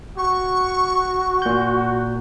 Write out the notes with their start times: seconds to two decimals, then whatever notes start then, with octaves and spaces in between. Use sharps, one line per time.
0.18 F#4 C#6
1.42 A#2 G6